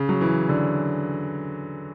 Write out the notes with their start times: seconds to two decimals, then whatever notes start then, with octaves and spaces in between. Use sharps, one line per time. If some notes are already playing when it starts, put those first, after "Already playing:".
Already playing: C#3
0.09 F#3
0.21 E3
0.49 D3